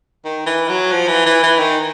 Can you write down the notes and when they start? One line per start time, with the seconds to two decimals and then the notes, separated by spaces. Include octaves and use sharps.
0.25 D#3
0.46 E3
0.69 F#3
0.92 F3
1.08 E3
1.26 E3
1.43 E3
1.59 D#3